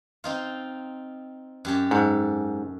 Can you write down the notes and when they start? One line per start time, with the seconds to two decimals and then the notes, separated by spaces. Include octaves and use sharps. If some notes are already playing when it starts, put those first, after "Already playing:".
0.24 C4 D#4 F4
1.65 F#2 G4 A5
1.91 G#2 A4